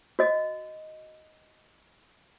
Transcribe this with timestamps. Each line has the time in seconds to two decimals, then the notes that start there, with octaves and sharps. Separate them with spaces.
0.19 F#4 D#5